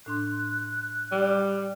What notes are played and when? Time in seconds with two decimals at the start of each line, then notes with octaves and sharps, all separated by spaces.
0.06 A2 D4 C6 F#6
1.12 G3